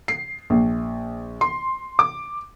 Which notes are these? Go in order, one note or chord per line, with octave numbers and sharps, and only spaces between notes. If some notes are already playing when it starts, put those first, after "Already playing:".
C7
A#1
C6
D6